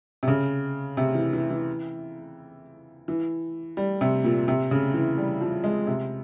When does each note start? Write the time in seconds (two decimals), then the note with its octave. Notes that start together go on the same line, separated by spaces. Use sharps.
0.23 C3
0.28 C#3
0.97 C3
1.15 E3
1.33 E3
1.50 E3
3.08 E3
3.77 G3
4.01 C3
4.24 A#2
4.48 C3
4.71 C#3
4.94 E3
5.18 G3
5.41 F3
5.64 G#3
5.87 C3